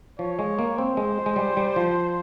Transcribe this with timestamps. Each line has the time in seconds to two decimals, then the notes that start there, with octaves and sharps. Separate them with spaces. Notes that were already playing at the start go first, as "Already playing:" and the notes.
0.19 F3 C#5
0.39 G#3
0.59 A#3
0.78 C4 C5
0.97 G#3
1.26 G#3
1.36 G3
1.57 G3
1.76 F3